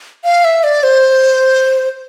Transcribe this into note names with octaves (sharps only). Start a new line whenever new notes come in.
F5
E5
D5
C5